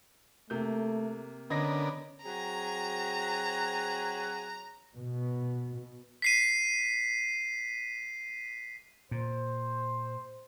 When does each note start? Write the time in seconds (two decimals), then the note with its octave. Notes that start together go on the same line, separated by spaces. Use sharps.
0.50 C3 A3 A#3 G6
1.50 D3 B3 C#4 A#4 D#5 G#6 A#6
2.24 F#3 C4 G#4 A#5
4.97 B2
6.22 B6 C7 D#7
9.11 A#2 C5